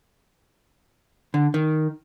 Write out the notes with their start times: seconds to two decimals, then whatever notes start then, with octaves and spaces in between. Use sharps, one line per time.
1.34 D3
1.54 D#3